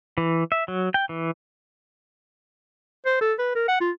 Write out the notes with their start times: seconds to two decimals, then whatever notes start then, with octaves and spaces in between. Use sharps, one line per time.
0.18 E3
0.52 E5
0.68 F#3
0.94 G5
1.09 E3
3.06 C5
3.21 A4
3.39 B4
3.55 A#4
3.68 F#5
3.81 F4